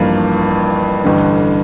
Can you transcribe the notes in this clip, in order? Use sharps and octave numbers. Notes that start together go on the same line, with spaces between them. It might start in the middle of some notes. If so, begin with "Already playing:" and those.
Already playing: A1 G2 F3 A#3
A1 G2 D3